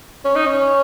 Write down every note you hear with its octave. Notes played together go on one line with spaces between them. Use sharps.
C#4
D#4
C#4